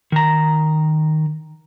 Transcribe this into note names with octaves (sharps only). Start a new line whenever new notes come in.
D#3 A#5